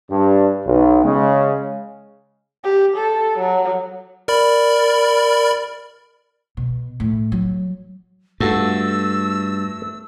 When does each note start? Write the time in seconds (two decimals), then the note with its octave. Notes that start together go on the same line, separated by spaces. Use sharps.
0.11 G2
0.66 B1
1.04 C#3 G#3
2.64 G4
2.97 A4
3.39 F#3
4.28 A#4 D5 B5
6.57 B2
7.00 A2
7.32 F#3
8.40 G2 A3 F4 F#4 A4 E6